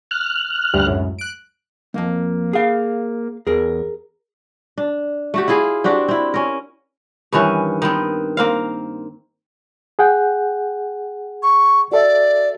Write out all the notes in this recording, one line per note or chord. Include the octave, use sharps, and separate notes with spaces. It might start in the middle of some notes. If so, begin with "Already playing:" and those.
F6 F#6
D2 G2 G3
C#2 F#2 A2
F#6 D7
B1 F2 A#3
G#4 F5
E2 G#4 A#4
D4
A3 F#4 G4
E4 F4 G#4 F5
C4 D4 F#4 G4
C4 E4
C#4 A#4
G2 D#3 E3 C#4
D#3 B3 C4
A#3 C4 F5
G#4 F#5 G5
C#6
F#4 A4 D5 E5